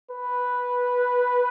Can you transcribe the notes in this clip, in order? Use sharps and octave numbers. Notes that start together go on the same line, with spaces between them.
B4